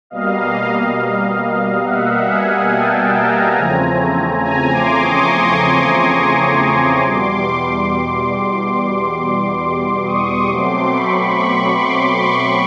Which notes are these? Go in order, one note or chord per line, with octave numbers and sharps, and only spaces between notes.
B2 G3 A#3 D#5 F5
E5 F#5
F#5 G#5
G5 A5
G#5 A#5
E2 C#3 F3 A3 C4
G#5 A#5
C6 D6
C#6 D#6
C6 D6
C#6 D#6
E2 B2 G3 C6 D6
C#6 D#6
B2 F#3 A3 C4 C6 D6
B5 C#6
B5 C#6
C6 D6
B5 C#6